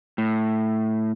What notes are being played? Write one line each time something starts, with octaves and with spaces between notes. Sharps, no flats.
A2